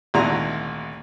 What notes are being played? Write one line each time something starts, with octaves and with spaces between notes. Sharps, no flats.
G#1 D2 A#2 E4 F#4 A#5